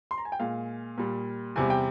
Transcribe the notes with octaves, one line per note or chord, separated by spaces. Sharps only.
C6
A#5
G#5
G5
A#2 G#3 F5
A#2 G3
E2 C3 G3 G#5
G5